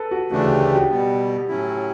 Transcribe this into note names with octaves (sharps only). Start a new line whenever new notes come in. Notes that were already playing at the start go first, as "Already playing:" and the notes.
Already playing: A4 B4
F#4
D2 C#3 E3 A3 D4 F#4
G4
G4
F#4
B2 G3 B3
A2 F#3 C#4 E4